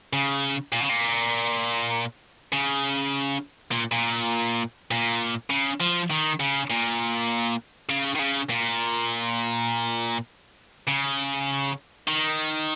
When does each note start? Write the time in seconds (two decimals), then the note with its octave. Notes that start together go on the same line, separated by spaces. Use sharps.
0.13 C#3
0.73 A#2
0.81 C#3
0.90 A#2
2.52 C#3
3.71 A#2
3.92 A#2
4.91 A#2
5.50 C#3
5.81 F3
6.11 D#3
6.40 C#3
6.70 A#2
7.89 C#3
8.15 D#3
8.19 C#3
8.50 A#2
10.88 C#3
12.07 D#3